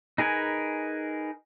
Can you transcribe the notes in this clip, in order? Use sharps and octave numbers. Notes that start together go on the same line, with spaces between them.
D#4 G#4 A#4 B4 G#5